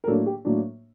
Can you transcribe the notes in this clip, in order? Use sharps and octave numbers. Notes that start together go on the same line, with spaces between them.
A#4
A2 F#3 A#3 D4 A4
G4
A2 F#3 A#3 D4